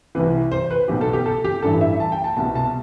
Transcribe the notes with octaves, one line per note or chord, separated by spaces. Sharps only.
C2 C3 E3 B4
C5
B4
B1 B2 G4
A4
G4
A4
G4
A1 G2 E3 A4
E5
A5
G5
A5
C2 B2 A5
A5